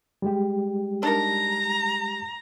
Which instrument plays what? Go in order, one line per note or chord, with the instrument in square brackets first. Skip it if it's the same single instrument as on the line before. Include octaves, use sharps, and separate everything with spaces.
[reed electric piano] G3 G#3 G4
[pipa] D4 D#4 A#4 [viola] A#5